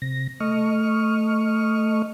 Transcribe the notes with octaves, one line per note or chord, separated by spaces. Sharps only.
C3 A#6
A3 D#5 C#6 F6